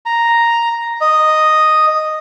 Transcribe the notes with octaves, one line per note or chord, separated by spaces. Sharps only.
A#5
D#5